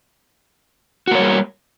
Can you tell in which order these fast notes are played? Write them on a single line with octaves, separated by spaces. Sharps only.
F#4 A#3 C#5 G3